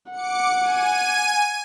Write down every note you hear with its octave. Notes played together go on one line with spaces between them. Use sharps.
F#5 D6 C#7
G#5 D#7